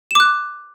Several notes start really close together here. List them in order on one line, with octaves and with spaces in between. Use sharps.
E7 D6 F#6